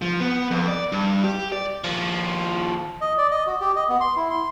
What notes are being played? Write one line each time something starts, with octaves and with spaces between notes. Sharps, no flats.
F3
B3
F2
D5
G2
G4
D5
D#2 F3
D#5
D5
D#5
F#4
G4
D#5
B3
C6
E4
C6